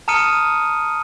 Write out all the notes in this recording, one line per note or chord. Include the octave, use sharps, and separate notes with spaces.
A5 A#5 D#6 F6 C#7 D#7